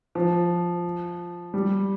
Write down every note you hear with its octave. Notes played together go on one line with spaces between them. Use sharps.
F3
G3